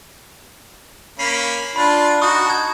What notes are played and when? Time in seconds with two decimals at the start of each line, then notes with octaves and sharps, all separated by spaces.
1.19 A#3 C#4 B5 B6 C7
1.76 D4 F4 B5
2.22 D#4 F#4 C#6 D#6
2.46 A5 G#6